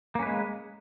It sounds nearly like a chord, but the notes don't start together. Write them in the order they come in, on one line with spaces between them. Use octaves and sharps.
A#3 C#4 B4 G#3